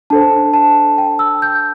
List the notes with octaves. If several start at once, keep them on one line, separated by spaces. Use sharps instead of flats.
D4 A4 C5 A5
A5
G5
E6
G6